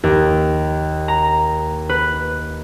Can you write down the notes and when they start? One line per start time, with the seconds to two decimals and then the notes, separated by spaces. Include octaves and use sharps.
0.03 D#2
1.08 A#5
1.89 B4